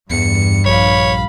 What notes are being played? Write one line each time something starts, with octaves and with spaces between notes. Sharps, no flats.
E2 G2 C#7
A#1 C#5 F5 B5